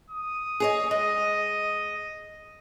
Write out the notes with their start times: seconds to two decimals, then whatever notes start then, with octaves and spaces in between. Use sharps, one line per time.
0.10 D#6
0.60 G#4 C#5 D#5
0.91 G#3 D#5